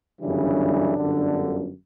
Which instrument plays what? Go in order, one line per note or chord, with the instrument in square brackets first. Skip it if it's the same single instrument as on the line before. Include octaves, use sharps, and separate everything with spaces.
[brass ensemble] G1 F#2 C#3 E3 G3 D4
G1 F#2 D3 G3